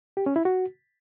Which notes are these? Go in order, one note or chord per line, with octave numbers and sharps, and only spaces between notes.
G4
C#4
E4
F#4